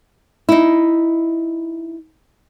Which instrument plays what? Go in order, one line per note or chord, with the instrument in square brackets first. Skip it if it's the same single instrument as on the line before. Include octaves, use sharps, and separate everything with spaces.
[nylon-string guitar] D#4 E4